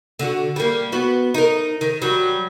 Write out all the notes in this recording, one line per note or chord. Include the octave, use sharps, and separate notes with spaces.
D3 F#4
G3 A#3
B3 F#4
D#4 A#4
D#3
F#3 G3